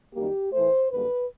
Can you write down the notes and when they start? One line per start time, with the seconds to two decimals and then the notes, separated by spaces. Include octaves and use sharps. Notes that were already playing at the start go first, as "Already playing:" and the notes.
0.14 F#2 D#3 G3 A#3 G4
0.52 A2 E3 A3 C5
0.91 F#2 D3 G3 A#3 B4